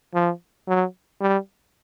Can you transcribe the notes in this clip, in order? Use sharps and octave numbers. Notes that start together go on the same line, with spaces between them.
F3
F#3
G3